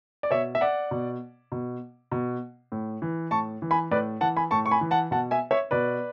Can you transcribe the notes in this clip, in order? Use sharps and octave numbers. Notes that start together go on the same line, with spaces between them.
D5
B2 C#5 E5
E5
D5 F#5
B2
B2
B2
A2
E3
A2 A5 C#6
E3
G#5 B5
A2 B4 D5
E3 F#5 A5
G#5 B5
A2 A5 C#6
C#6
G#5 B5
E3
F#5 A5
B2 F#5 A5
E5 G#5
C#5 E5
B2 B4 D5